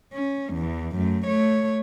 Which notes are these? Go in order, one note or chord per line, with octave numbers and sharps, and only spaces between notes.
C#4
E2 E3
F#2 A3
A3 C#5